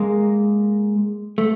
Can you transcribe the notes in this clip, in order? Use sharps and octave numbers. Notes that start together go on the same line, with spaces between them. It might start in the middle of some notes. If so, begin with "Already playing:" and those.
Already playing: G#3 A#3
A3